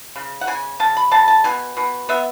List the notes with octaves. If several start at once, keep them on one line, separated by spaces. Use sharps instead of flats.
C#3
F#5
C#3 G#5
C#3 A5
B5
C#3 A5
A5
B2 G#5
B2
B3 E5